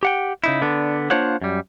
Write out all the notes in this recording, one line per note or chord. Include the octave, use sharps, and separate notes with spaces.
G4 F#5 G5
C#3 D#4 E4
D3 B3 D4
A#3 D4 F4 C5 C#5 F#5
F#2 G3